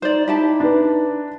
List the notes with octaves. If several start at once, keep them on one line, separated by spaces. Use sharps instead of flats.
D#4 C5 D5
D#4 E4 G4 A5
D4 B4